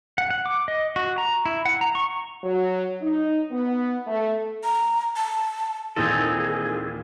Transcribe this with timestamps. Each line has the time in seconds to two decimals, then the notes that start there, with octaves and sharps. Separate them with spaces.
0.18 F#5
0.30 F#5
0.46 D6
0.68 D#5
0.96 F#4
1.18 A#5
1.46 E4
1.65 F#5
1.81 A#5
1.95 C#6
2.44 F#3
3.01 D#4
3.51 B3
4.07 A3
4.64 A#5
5.16 A5
5.96 D#2 A#2 E3 C4 D#4 G#4 A4